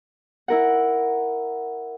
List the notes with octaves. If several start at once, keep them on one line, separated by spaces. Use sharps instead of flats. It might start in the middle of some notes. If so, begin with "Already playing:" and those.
E4 A#4 F#5